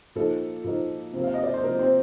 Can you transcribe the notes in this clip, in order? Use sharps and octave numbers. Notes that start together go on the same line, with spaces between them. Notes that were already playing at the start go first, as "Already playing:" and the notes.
A#2 F3 A#3 D#4 A4
A#2 F3 A#3 D#4
C3 F3 A#3
F5
D#5
D5
C5
C3 F3 A#3 A#4
C4 C5